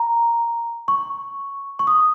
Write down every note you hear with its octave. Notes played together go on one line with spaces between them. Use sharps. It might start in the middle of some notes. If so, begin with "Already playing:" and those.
Already playing: A#5
C#6
C#6
D#6